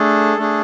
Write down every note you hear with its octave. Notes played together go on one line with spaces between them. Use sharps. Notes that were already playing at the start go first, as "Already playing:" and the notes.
Already playing: A3 D4 G#4 A4
A3 D4 G#4